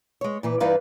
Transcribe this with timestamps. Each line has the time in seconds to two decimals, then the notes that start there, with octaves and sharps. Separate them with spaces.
0.21 G#3 C#5
0.43 A#2 E3 B4
0.60 G2 E3 D#4 B4 D5 F5